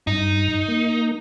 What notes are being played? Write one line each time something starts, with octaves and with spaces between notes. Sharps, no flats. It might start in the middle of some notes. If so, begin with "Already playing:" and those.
G2 D#4
A#3